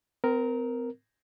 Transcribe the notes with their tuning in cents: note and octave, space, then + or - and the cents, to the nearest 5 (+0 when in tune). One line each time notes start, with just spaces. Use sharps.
C4 -40 A#4 +0